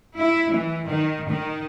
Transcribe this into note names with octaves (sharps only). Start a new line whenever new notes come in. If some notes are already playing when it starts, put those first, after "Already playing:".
E4
E3
D#3
D#3